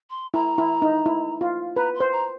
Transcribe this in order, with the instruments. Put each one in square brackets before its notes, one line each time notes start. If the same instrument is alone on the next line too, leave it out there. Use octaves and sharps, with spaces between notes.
[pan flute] C6
[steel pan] E4 [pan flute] A#5
[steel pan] E4
D#4
E4
F4
[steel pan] B4 [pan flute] A#5
[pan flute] C6
[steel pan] C5
[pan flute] A#5